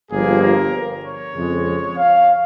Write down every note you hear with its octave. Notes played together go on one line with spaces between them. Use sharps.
G1 G2 F3 A#3 G#4
A#4
C#5
F2 C#3 G#3
F5